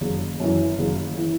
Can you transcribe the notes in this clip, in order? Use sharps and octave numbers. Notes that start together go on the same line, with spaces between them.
F#1
F#2 E3
F#1
E3